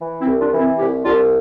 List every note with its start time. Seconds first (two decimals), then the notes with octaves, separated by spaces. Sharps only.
0.01 E3
0.20 C4 E4
0.27 C2
0.40 D4 F4
0.52 E3
0.59 C4 E4
0.78 C2 E4 G4
1.05 C2 D4 F4